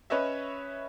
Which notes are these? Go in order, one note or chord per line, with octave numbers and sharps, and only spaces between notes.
C#4 B4 C#5 D#5 E5